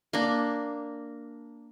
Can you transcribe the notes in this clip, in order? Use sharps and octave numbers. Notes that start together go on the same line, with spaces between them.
A#3 D4